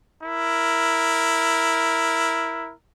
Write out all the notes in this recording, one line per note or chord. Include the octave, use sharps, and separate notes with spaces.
E4 A#4